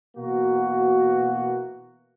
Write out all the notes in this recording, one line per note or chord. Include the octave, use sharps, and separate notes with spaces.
B2 E3 A#3 F#4